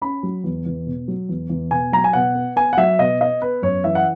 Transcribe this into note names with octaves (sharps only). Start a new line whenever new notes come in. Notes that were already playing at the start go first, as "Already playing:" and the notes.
C#4 B5
F#3
E2
E2
B2
F#3
E2
E2
B2 G#5
F#3 A#5
G#5
B2 F#5
B3
B3 G#5
F#5
F#3 E5
B2 D#5
B3 D#5
B3 B4
F#2 C#5
E3 E5
F#5